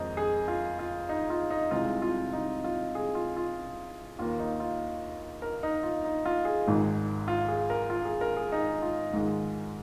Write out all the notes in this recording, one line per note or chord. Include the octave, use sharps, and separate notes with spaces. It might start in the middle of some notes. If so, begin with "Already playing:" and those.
Already playing: F2 D#3 G#3 A#4 C5 D#5
G#4
F4
F4
D#4
F4
D#4
C2 C3 G#3 C4 F4
F4
D#4
F4
G#4
F4
F4
D#2 D#3 A#3 F4
D#4
F4
A#4
D#4
F4
D#4
F4
G#4
G#1 G#2 D#3
F4
G#4
A#4
F4
G#4
A#4
G#4
D#4
F4
G#2 D#3 G#3